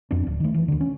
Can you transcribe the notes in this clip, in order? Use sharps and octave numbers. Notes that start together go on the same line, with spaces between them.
F2 C4 D4
D1
D#3 A3
E3
D2 D3
C#4